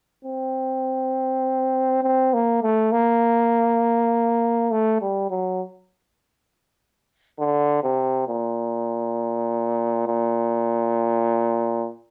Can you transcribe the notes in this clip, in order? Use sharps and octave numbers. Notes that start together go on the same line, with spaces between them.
C4
C4
A#3
A3
A#3
A3
G3
F#3
D3
C3
A#2
A#2